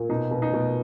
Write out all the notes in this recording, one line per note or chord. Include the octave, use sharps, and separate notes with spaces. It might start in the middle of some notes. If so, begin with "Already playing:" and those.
Already playing: A#2
B2 D#4
B2
D#4
B2